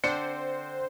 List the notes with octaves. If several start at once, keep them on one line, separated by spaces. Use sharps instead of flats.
D3 C4 D4 C5 C#7